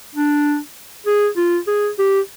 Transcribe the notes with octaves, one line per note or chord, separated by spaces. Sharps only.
D4
G#4
F4
G#4
G4